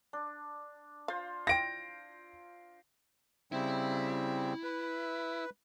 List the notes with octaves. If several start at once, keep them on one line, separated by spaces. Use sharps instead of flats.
D4
F4 C5 F5
E4 F5 G5 A#6 D7
C#3 G3 C4 E4
B4